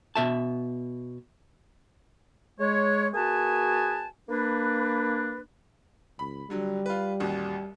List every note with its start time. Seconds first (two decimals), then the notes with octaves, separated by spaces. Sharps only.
0.16 B2 E5 A5
2.59 G#3 C#5
3.14 A#3 F#4 G#4 B4 G#5 A5
4.29 A#3 D4 B4
6.19 C#2 B5
6.50 D3 F#3 G3
6.86 F4 B4
7.20 A1 D#2 F#4